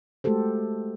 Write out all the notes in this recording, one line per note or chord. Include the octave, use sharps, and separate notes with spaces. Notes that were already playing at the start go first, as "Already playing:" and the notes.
G#3 A3 F#4 G4 A4 C5